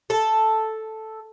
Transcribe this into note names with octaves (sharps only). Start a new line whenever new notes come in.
A4